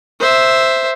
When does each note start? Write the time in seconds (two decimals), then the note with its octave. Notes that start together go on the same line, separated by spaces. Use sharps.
0.20 C5 E5